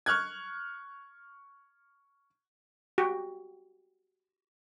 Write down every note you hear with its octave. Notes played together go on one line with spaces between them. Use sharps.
C#6 F6 F#6 G#6
F#4 G4